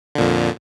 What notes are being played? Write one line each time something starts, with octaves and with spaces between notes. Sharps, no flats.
F2 A#2 D3